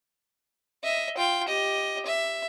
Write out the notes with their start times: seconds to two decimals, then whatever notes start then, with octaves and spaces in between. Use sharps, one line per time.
0.83 D#5 E5
1.17 F4 G5
1.48 G4 D#5
2.06 E5